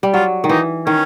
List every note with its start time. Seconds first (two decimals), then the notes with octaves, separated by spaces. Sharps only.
0.03 G3
0.13 F#3 F4
0.44 D#3
0.49 E3 D#4
0.86 D#3 C#4